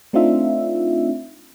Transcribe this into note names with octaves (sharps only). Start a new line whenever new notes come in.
A3 C4 D4 D#4 F4 E5